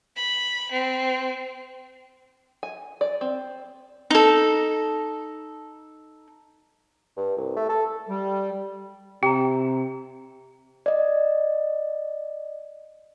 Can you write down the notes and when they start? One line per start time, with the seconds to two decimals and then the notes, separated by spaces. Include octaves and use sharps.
0.16 B5
0.72 C4
2.63 G#5
3.01 D5
3.21 C4
4.10 D#4 A4
7.17 G2
7.37 C2
7.56 A3
7.69 A4
8.09 G3
9.23 C3 G4 G5 A#5
10.86 D5 D#5